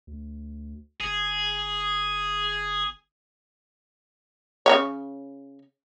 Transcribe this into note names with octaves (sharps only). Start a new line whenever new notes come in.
D2
G1 G#4
C#3 B3 C#5